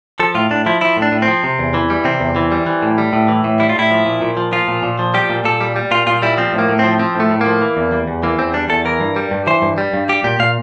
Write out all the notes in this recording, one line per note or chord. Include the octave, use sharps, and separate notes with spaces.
F3 A4
A2 F4
A2 D4
F3 E4
F3 E4
A2
D4
A2
C4
F3
C3
E2
E3
G3
C3 C4
E2
E3
G3
E3
A2
G3
A2
E3
A2
G3 E4
F4
A2 E4
F3
A#2
A#2
F3
F3 F4
A#2
A#2
F3
G3 G4
A#2
A#2 A4
G3
G3
A#2 F4
A#2 F4
G3 E4
F3 C4
A2
A#3
A2
F3 C4
F3 C4
A2 A3
A2
A#3
F3
E3
E2
G3
E2
E3 A#3
E2 C4
G3 D4
E2 A4
E3 A#4
G2
G3
G2
E3 C5
G2
G3
G2
G3 G4
A#2 G4
A#2 F5